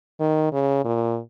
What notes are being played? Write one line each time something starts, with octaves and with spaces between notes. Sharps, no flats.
D#3
C#3
A#2